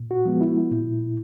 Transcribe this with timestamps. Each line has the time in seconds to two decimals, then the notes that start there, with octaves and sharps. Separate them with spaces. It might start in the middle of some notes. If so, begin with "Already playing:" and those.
Already playing: A#2
0.11 F#4
0.25 F3 G#3 B3
0.41 E4
0.71 A#2